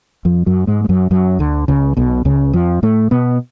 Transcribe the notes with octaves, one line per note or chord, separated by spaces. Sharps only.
F2 F3
F#2 F#3
G#2 G#3
G#3
F#2 F#3
F#2 F#3
D2 D3
C#2 C#3
B1 B2
C#2 C#3
F2 F3
A2 A3
B2 B3